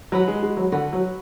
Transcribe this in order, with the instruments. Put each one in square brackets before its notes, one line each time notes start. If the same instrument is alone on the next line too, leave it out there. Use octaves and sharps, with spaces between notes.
[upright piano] F#3 [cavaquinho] F#4 B4 F#5 B5
[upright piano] G#3
G#3
F#3
[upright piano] D3 [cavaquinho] F#4 B4 F#5 B5
[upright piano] F#3